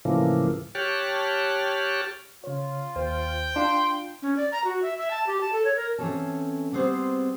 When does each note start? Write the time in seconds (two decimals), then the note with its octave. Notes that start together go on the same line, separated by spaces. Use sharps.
0.05 A2 C#3 E3 F3 A#3
0.75 G4 C#5 G5 A5 F6 F#6
2.44 C#3 F4 C#5
2.96 D#2 C5 G5
3.56 D4 F4 F5 C6
4.22 C#4
4.37 D5
4.52 A#5
4.64 F#4
4.82 E5
4.98 E5
5.11 A5
5.27 G4
5.41 A5
5.52 A4
5.64 C#5
5.76 A#4
5.98 E3 C4 C#4 A4 C#5 A5
6.73 G3 B3 C4 G#4 C5